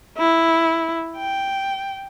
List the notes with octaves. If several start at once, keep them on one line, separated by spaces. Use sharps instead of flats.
E4
G5